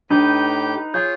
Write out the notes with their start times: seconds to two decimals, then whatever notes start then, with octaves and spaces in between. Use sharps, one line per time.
0.10 A2 D4 D#4 G4 B4 G6
0.94 F4 G#4 C#5 G6